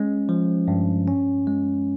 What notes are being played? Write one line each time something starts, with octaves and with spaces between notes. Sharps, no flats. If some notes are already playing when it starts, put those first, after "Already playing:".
Already playing: G#3 C#4
F3
G2
C#4
G#3